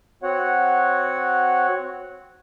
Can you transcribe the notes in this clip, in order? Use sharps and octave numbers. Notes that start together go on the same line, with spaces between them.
C4 F#4 C#5 F#5